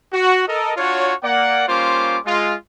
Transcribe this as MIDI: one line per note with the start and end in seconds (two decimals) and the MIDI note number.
0.13 0.47 66
0.48 0.73 69
0.48 0.73 70
0.48 0.73 75
0.77 1.14 62
0.77 1.14 65
0.77 1.14 66
0.77 1.14 73
1.23 1.67 58
1.23 1.67 74
1.23 1.67 78
1.68 2.18 55
1.68 2.18 58
1.68 2.18 61
1.68 2.18 65
1.68 2.18 72
1.68 2.18 86
2.25 2.54 56
2.25 2.54 65